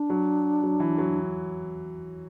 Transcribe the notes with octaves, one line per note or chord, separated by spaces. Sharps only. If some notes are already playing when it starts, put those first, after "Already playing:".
Already playing: D4
F#3
F#3
E3
F#3